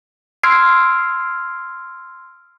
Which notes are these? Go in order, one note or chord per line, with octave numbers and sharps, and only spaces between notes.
C6 E6 F6 G#6 C7 D7